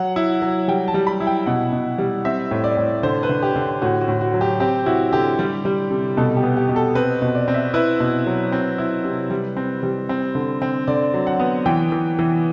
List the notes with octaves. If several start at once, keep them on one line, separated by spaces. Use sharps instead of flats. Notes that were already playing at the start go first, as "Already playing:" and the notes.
Already playing: F#3 F#5
E4
F#3
G3 G5
A5
G3
B5
E4
G5
B2 F#5
B2
G3
C4 E5
A2
D5
A2
D3 C5
B4
D3
G4
D3
A2 F#4
F#4
A2
F#4
F#3
G4
C4 G4
E4 F#4
D3 G4
G3
G3
C3
B2 A4
G4
B3
G4
B2
A4
C4 B4
B2
D5
C4
E5
E4 B4
B2
F#3
C4
E4
C3
G3
C4
G3
C4
D3
C4
D3 D5
F#3
F#5
B3
E3 G5
E3
E3